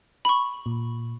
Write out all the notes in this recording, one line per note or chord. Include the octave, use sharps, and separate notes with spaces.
B5 C#6
A#2